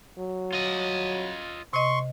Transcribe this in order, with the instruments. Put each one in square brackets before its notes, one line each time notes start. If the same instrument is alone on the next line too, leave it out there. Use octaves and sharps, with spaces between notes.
[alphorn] F#3
[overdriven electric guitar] F4 D#5
[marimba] C3 D#5 [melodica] C6 C#6